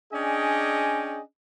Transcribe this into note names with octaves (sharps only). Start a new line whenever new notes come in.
C#4 D4 G#4 D5 D#5 G5